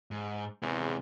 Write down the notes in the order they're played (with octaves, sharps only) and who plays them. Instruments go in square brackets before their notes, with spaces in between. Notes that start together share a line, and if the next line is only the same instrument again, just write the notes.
[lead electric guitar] G#2
[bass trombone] E2 [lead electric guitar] C3 G#3